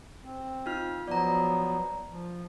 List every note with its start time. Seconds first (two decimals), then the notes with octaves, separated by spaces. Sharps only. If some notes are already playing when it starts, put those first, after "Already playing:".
0.24 C4
0.66 D#4 F4 F6
1.08 F3 F#3 B3 D5 A#5
2.10 F3